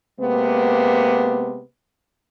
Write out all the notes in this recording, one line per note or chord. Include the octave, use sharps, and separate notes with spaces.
C3 G#3 A#3 B3